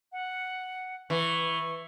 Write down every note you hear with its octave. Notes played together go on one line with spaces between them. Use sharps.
F#5
E3 C#6